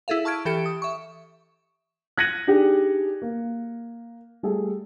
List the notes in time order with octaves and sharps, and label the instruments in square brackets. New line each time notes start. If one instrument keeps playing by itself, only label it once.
[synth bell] E4 G#4 A4 E5 F5
A5 C#6 F6 G#6 D7
E3 G4 A4 G5 C#7 D7
D#6
E5 C#6
[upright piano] F#6 G#6 A#6 C#7 D#7 F#7
D4 D#4 G4 G#4
A#3
G3 A3 G#4 A4